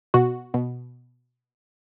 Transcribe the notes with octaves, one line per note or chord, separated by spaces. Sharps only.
B2 F#4
B2